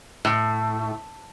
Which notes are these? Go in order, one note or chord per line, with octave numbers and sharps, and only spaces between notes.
A2